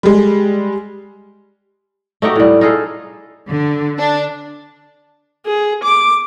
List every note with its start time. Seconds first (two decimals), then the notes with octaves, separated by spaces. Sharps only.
0.03 G3 G#3
2.22 A3 D#4 F#4 G4
2.36 A2 G3
2.61 D#4 F4 G#4 A4
3.49 D3
3.99 D4
5.46 G#4
5.84 D6